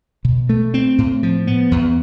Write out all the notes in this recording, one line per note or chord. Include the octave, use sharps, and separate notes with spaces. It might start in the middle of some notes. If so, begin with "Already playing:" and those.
B2
A3
C4
A2
F3
B3
E2